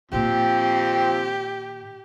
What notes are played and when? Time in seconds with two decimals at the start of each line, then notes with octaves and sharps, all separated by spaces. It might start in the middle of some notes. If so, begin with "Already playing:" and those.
0.12 A#2 D#3 F3 C4 G4